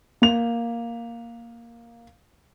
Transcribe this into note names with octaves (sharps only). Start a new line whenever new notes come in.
A#3 F7